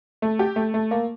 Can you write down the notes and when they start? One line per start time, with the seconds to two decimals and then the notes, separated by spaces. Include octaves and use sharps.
0.22 A3
0.39 G4
0.56 A3
0.74 A3
0.91 A#3